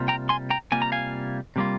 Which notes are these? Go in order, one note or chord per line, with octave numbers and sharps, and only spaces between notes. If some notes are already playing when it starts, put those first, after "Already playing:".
Already playing: C3 G3 A#3 F4
G5 A#5
G#5 C6
G5 A#5
C3 G3 A#3 F4 G#5
A#5
F5 G#5
C3 G3 A#3 F4